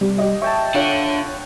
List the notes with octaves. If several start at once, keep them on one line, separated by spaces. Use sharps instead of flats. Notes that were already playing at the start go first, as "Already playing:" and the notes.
C3 G3
G4 D#5
C#5 E5 G5 A5
D3 F4 C#5 F#5